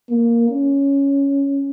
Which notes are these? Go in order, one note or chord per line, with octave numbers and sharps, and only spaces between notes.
A#3
C#4